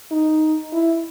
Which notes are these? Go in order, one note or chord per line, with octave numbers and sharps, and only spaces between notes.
D#4
E4